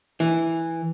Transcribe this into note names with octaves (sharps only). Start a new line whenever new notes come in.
E3